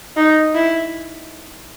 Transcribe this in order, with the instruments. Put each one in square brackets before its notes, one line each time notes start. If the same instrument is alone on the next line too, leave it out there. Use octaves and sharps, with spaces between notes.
[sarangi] D#4
E4